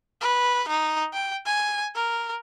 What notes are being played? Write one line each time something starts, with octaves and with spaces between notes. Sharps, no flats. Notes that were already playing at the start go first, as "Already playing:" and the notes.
B4
D#4
G5
G#5
A#4